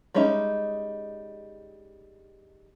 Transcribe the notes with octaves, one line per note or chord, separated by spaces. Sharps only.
G3 G#3 C#4 D#4 E5